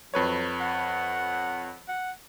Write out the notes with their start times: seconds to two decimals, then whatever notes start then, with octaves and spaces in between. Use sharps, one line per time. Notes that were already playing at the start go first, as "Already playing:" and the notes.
0.14 F2 F#3 B4 C#5
0.61 F#5
1.88 F#5